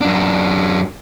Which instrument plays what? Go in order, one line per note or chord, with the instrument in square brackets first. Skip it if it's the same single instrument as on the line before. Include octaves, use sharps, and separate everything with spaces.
[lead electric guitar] F#2 D4